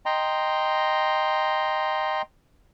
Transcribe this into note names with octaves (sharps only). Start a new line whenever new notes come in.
D#5 G5 A#5 C6